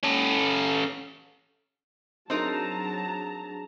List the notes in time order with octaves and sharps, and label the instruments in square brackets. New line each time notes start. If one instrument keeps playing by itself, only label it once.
[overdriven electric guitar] C#4 A4
[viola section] F#3 A5 A#5 [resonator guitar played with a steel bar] C4 D#4 A#4 [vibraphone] D4 G#4